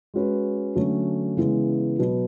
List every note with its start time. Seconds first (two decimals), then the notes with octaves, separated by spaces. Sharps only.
0.14 G#3 C#4 F#4 B4
0.75 D3 F#3 A3 C#4
1.37 C#3 E3 G#3 B3 E4
1.99 B2 F#3 B3